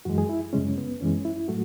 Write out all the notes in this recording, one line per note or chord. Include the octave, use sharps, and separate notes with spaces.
F#2 E3 G#3 F#4
G#4
E4
F#2 C#3 G#3 C#4
B3
F#2 E3 G#3 C#4
E4
A2 F#3 A3 F#4